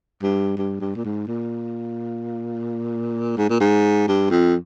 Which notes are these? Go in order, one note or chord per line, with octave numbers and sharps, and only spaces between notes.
G2
G2
G2
A#2
G#2
A#2
G#2
A#2
G#2
G2
F2